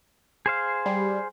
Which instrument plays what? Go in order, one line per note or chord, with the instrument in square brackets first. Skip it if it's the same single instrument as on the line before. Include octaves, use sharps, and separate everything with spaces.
[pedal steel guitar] G#4 C5 F5
[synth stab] G3